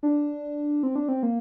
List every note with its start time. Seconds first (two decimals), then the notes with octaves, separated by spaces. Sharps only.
0.03 D4
0.83 C4
0.96 D4
1.09 C4
1.23 A#3